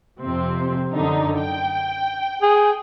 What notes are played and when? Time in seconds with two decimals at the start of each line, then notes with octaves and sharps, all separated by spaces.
0.21 F2 C3 C4
0.93 F#2 D3 D#4
1.40 G5
2.42 G#4